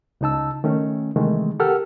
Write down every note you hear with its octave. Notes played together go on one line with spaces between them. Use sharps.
C#2 C#3 D#4 A5 E6
D#3 A3 C#4
C3 D#3 E3 G#3 A3
G4 A4 A#4 F#5 E6 F6